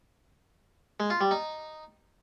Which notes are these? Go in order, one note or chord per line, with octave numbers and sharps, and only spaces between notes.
G#3
F4
G3
D#4